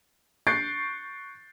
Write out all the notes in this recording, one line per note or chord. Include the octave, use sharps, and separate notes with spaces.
C#6 F#6 G6 A6 C7 D7